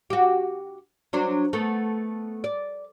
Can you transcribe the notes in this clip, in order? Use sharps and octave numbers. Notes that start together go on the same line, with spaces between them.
F#4 G4
F#3 D4 C5
A3 B3
D5